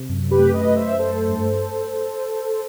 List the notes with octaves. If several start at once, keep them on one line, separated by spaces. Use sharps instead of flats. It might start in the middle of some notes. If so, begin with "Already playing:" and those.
Already playing: C3
F#2
G4 B4
A3
B4 D#5
F#2
C5 E5
A3 A4 C5
G2